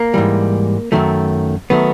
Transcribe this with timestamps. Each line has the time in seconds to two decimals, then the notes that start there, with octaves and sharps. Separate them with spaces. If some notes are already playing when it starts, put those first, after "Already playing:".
Already playing: A#3
0.14 G#2 E3 G3
0.92 F#2 D#3 F#3 A3
1.70 D#3 F#3 A3 B3